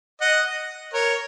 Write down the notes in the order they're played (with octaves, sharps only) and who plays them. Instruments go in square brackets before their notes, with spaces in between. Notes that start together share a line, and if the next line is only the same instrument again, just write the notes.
[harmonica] D#5 F#5
A#4 C#5